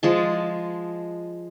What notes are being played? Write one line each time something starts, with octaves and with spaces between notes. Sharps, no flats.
F3 G#3 A5